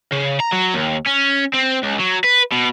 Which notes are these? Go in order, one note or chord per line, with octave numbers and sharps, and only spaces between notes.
C#3
A#5
F#3
D#2
C#4
C4
C#2
F#3
B4
B2